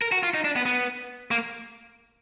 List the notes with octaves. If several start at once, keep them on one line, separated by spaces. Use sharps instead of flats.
A#4
F#4
F4
D#4
D4
B3
B3
A#3